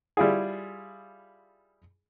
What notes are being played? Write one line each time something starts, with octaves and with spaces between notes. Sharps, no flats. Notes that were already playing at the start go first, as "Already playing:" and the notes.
G3 E4 F4 G#4